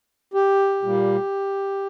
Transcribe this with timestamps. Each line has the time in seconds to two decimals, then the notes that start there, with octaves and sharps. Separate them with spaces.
0.34 G4
0.83 A#2 G3 A#3